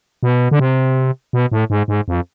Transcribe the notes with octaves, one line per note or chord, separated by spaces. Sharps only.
B2
D3
C3
B2
A2
G#2
G#2
F2